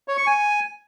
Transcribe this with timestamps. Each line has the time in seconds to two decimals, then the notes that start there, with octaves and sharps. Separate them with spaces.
0.08 C#5
0.17 C#6
0.27 G#5